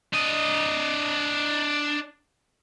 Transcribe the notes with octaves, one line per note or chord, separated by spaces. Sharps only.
D4 D#5